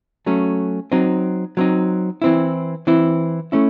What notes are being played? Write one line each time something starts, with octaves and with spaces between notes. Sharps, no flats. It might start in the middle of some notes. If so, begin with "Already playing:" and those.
F#3 A3 C#4
F#3 C4 D#4
F#3 C4 D#4
E3 C4 E4
E3 C4 E4
A3 C#4 E4